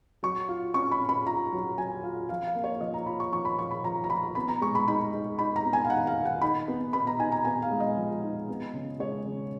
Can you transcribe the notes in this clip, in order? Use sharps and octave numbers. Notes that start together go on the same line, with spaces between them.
F#3 C#6
F4
C#4 C#6
B5
C#4
B5
F4 A#5
F#3
F#3 G#5
F4
F3 F5
F5
A#3
C#5
F3 D#5
A#5
F4 B5
C#6
F3 C#6
B5
F3 C#6
B5
F3 A#5
A#5
F3 B5
B3 B5
A#5
G#3 C#6
B5
D#4 B5
D#4
D#4 B5
A#5
B3
G#5
F5
D#3 F#5
F5
D#3
F#5
D#4 B5
B3
B3 B5
A#5
D#4 G#5
A#5
B3 G#5
F5
G#3
D#5
F3
D#4
B3
C#3
G#3 C#5
C#3